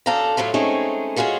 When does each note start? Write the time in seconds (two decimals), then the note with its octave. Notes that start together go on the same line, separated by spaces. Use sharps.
0.06 F#2 D4 A4 F5 G5 A#5
0.37 A2 F#3 A3 F4
0.54 G#3 A3 C4 C#4 D#4 G#4
1.16 G#3 C#4 F4 F#4 G#4